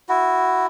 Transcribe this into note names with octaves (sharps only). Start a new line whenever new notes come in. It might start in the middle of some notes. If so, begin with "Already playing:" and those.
E4 F#4